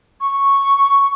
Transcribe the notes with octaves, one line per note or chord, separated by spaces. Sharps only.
C#6